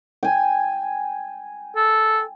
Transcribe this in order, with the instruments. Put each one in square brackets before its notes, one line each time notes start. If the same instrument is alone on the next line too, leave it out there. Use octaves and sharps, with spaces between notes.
[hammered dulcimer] G5 G#5
[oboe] A4